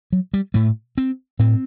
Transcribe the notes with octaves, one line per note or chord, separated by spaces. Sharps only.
F#3
G3
A2 A3
C4
A2 C4